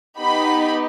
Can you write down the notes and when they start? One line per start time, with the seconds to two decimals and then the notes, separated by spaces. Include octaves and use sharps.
0.19 B3 D#4 G4 B5